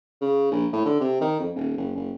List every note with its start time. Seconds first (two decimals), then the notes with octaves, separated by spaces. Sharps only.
0.21 C#3
0.52 A#1
0.73 A2
0.85 D3
1.01 C3
1.21 D#3
1.39 F2
1.56 D#1
1.78 F#1
1.95 F#1